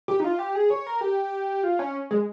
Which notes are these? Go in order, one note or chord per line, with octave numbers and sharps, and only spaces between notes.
G4
D#4
F4
G4
G#4
C#5
A#4
G4
F4
C#4
G#3